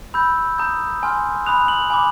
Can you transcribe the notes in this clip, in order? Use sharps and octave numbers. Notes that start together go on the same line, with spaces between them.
B5 E6 G6
A#5 D#6 G6
G#5 C6 F6
B5 D#6 F#6 F7
F#7
G#5 B5 D6